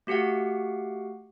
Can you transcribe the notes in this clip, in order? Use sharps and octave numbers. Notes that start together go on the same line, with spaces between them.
A3 F#4 G4 F5 F#5